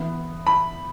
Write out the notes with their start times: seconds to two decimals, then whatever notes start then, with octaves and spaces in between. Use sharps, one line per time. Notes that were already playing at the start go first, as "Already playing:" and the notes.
Already playing: E3 B3 E4
0.47 B5